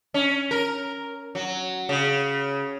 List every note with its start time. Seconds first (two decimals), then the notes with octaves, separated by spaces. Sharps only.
0.14 C#4
0.51 A#4
1.35 F#3
1.89 C#3